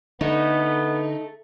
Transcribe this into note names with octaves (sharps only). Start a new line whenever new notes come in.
D3 A3 B3 D#4